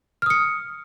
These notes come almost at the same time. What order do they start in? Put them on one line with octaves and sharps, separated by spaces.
F6 D#6 C#7